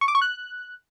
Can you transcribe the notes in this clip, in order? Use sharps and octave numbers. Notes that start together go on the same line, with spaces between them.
C#6
D6
C#6
F#6